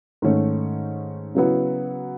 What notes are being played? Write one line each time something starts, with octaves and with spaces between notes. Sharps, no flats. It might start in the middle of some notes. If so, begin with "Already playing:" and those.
G#2 D#3 A3 C#4
C#3 F#3 B3 E4